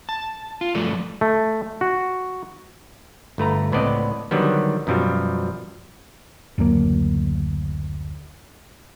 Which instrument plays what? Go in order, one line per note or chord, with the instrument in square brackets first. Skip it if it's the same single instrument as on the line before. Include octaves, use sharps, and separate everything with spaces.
[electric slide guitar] A5
F4
G2 F3 F#3 A3 A4 D5
[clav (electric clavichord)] A3
F#4
G1 A3 B4 A#5
C#2 A2 B3 C4 D5 D#5
D3 D#3 F#3 G3 B3
F#2 B2 F3 G3
[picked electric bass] F#1 D2 F#3 A#3